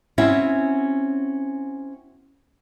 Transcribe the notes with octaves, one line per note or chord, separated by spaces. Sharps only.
C4 C#4 E4 F#4 C#5 E5